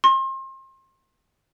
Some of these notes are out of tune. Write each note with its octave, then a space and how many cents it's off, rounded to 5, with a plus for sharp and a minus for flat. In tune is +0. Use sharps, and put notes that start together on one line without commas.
C6 +35